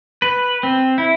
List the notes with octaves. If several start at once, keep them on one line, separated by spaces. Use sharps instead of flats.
B4
C4
E4